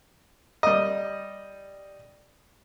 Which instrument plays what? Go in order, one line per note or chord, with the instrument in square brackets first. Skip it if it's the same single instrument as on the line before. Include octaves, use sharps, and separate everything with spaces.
[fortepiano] G3 D#5